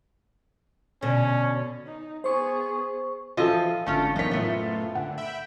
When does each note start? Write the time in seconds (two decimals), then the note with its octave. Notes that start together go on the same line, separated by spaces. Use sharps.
1.02 B2 D3 C#4
1.86 D#4
2.24 B3 G#4 C5 C#6
3.37 E3 F3 F4 A4 D#5
3.86 G#1 D3 A3 C#4 D4 F4 A5
4.16 F#1 E3 B3 D#4 C#5 B6
4.31 A2 A3 B3 F4
4.95 D3 F#5
5.18 E5 G5 B5